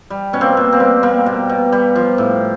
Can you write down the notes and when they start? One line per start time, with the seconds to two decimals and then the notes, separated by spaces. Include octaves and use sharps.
0.10 G3
0.33 B2 C#4
0.41 A#3 C4
0.57 B2
0.72 A#3 C4
0.80 G3
1.03 G3 A#3
1.26 B2
1.49 B2
1.72 G3
1.95 F3
2.18 A2